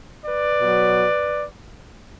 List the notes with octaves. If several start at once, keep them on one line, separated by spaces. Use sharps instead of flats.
B4 D5
B2 F#3